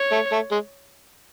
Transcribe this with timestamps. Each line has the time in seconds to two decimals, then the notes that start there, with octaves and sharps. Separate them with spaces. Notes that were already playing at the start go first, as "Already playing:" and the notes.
Already playing: C#5
0.12 A3
0.32 A3
0.52 G#3